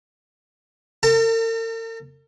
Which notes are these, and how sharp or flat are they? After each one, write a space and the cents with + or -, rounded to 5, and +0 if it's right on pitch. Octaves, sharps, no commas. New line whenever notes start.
A#4 -45 A5 +40